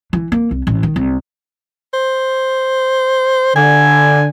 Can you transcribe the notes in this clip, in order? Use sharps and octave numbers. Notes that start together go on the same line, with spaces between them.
E3
A#3
C2
A1
D#3
C2
C5
D3 G#5